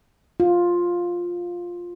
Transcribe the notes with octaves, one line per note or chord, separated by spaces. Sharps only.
F4